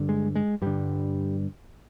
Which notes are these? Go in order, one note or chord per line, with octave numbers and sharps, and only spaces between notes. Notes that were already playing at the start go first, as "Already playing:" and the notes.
Already playing: G2 D3
G#3
G#3
G2 D3 G3